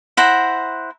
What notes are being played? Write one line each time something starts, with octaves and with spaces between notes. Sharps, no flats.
E4 C5 F#5 A#5